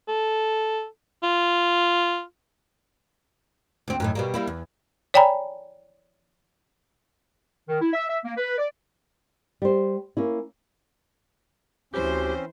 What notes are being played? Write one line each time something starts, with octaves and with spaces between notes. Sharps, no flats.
A4
F4
D2 C4
F#2 A2 D#3
B2 G3 A#3
G3 A#3 E4
E2
C#5 D5 G5 G#5 A#5 B5
D#3
E4
E5
E5
A#3
B4
D5
G3 C5
A#3 C#4 E4
D2 E3 C4 C#4 G4 C5